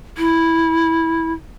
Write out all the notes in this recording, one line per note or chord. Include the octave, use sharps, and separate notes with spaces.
E4